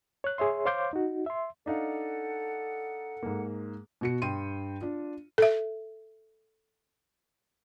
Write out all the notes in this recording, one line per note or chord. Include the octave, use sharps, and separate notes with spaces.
C#5 F#6
G#4 C#5 E5 C6
C5 C#5 F5 C6 D6 G6
D#4 F#4
E5 C6
D4 D#4 A4 F5 F#5
G#2 A#3
B2 F#4 C#7
G2 G5 C6 D#7
D4 F4
A4 E5